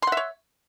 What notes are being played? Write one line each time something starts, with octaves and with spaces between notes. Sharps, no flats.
C#5 E5 F#5 C6